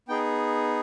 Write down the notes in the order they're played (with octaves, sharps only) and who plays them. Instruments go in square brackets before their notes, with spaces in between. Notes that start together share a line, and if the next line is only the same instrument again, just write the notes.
[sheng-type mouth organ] B3 D#4 G#4 G5